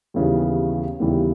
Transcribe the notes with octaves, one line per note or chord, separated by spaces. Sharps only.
D#2 C#3 E3 G3 B3
D#2 C#3 E3 G3 B3